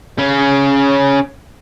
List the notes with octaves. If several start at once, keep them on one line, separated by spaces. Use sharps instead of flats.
C#3 C#4